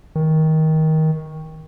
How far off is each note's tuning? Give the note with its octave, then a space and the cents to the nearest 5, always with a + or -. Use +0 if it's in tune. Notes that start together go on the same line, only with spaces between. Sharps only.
D#3 +20